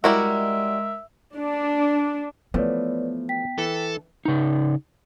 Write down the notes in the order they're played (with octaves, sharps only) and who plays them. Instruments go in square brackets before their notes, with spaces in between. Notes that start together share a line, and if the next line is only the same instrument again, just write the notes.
[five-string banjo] G3 E4 F#4 [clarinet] G#3 [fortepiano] A#4 [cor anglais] E5
[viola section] D4
[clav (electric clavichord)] E3 F3 A3 [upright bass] B3 [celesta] B4 C#5 D5
[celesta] G5 B6
[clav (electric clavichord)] E3 [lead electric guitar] A4
[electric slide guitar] C#3 D#4